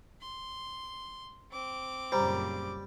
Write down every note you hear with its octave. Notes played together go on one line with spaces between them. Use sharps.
C6
C4 D6
F#2 A#2 C#3 G3 C5 A#5